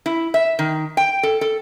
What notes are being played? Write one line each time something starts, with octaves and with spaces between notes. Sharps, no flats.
E4
E5
D#3
G5
A4
A4